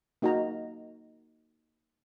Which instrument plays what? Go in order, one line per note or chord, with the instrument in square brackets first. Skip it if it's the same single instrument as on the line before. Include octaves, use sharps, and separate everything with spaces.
[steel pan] A#3 D#4 F#4 D#5 A#5